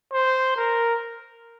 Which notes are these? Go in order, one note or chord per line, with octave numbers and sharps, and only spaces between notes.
C5
A#4